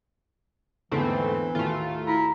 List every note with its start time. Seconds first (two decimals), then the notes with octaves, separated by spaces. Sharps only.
0.92 E2 G#2 D3 E3 A3 C4 C7
1.55 D#2 A2 A3 F4 F#4
2.07 E4 A#5